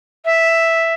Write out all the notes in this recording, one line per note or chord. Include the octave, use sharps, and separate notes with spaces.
E5